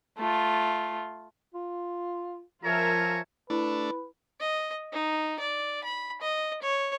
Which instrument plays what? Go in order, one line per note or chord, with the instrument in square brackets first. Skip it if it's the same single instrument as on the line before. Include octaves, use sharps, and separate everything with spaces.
[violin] A3 F4
[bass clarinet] F4
[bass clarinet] F3 [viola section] F4 A#4 E5 [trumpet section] C#5 G#5 A#5
[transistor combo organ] A3 D4 [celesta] E4 [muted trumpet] B4
[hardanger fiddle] D#5
D#4
D5
B5
D#5
C#5